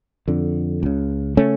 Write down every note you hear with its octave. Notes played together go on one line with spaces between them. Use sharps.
F2 D3
C#2 C#3
C#3 A3 C#4